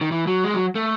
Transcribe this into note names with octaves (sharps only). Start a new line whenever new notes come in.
D#3
E3
F#3
G#3
F#3
A3